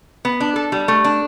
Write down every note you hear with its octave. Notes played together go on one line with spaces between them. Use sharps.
B3
D4
A4
G3
A3
D4